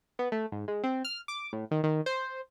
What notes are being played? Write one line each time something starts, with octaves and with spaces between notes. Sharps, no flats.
B3
A3
G#2
G#3
C4
F6
D6
A2
D#3
D#3
C5